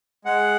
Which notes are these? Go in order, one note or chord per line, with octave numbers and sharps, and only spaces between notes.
G#3 F#5